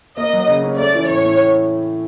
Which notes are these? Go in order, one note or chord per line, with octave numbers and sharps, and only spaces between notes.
A#3 D#5
F#3
C#3
C#4
A3 D5
E3
A2 C#5
A2